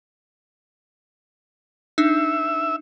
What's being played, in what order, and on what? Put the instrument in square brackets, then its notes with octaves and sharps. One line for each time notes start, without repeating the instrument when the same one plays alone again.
[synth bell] D4 D#4 [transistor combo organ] E5